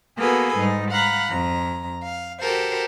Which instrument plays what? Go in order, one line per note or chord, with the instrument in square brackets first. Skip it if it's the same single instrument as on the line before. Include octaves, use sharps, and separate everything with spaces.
[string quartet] A#3 B3 F#4 G#4 A4 B4
G#2 G3 D#4
F5 F#5 A#5 B5
F2 A#5
F5
F#4 G4 A4 A#4 C5